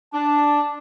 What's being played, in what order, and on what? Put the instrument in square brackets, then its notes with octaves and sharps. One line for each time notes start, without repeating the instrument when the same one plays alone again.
[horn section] D4 [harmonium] A5